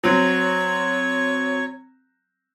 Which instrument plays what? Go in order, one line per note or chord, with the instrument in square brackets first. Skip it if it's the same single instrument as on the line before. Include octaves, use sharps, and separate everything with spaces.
[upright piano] F#3 C4 [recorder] C#5